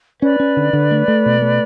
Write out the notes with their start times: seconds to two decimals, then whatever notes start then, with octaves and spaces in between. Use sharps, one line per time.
0.22 C#4 B4 D5
0.40 C#4
0.57 D3
0.73 D3
0.91 A3
1.08 A3
1.26 B2
1.42 A3